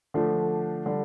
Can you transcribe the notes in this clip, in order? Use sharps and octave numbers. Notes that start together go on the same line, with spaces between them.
D3 F3 A3 D4
D3 G3